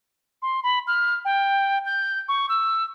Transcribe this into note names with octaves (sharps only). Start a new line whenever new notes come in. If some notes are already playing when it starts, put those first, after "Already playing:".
C6
B5
F6
G5
G6
C#6
E6